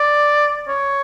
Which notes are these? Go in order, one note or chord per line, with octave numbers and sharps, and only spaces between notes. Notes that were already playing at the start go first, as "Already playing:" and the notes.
Already playing: D5
C#5